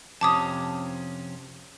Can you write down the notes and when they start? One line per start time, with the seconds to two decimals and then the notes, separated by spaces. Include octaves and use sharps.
0.21 F2 C3 C#4 A5 D6 D#6